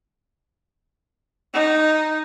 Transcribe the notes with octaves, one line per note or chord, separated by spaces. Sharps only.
D#4